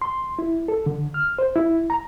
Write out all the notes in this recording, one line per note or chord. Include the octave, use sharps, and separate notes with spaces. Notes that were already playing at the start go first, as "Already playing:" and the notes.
C6
E4
A4
D3
F6
C5
E4
A#5